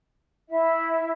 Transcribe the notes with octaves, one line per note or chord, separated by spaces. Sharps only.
E4 E5